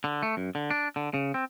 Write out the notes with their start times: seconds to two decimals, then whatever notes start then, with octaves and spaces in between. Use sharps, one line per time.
0.04 D3
0.23 A3
0.37 F#2
0.55 D3
0.71 D4
0.96 D3
1.14 C#3
1.34 C4